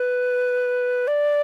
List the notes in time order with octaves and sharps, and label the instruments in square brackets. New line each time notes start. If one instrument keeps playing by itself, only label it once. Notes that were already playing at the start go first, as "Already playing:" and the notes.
Already playing: [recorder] B4
D5